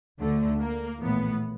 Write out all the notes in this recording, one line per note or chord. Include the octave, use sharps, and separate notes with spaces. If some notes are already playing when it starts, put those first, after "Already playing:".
D2 D3 A3
A#3
A#1 A2 E3 B3